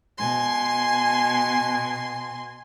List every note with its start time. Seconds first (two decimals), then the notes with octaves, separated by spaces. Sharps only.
0.17 B2 G#5 C6